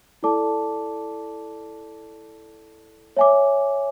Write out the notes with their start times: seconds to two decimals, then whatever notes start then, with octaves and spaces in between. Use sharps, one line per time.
0.23 E4 A4 D5 A5 D6
3.17 C#5 E5 G#5 D6